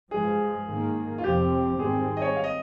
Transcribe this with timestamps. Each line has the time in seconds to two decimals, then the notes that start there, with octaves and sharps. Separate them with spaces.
0.11 G2 F3 G#3 G#4
0.68 G#2 D#3 A#3
1.18 F4
1.24 F2 C3 F3 C4 G4
1.79 G#2 D#3 G3 C4 G#4
2.17 D#5
2.22 C#5
2.36 F5
2.44 D#5